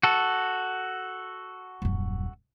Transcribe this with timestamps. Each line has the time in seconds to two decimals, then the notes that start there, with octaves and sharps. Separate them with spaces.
0.03 F#4 A4
1.82 D#1 F#2